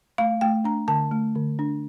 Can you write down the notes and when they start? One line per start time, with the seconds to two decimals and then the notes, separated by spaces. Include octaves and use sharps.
0.18 A3 F5
0.41 A3 G5
0.64 D4 A#5
0.88 D3 A5
1.11 A3
1.35 D3
1.59 D4